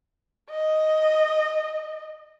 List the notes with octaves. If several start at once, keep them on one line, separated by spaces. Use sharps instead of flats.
D#5